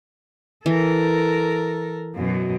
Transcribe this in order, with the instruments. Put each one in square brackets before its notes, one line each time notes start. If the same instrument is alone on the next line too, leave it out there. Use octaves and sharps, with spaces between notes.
[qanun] E3 [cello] A4 A#4
[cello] F#2 B2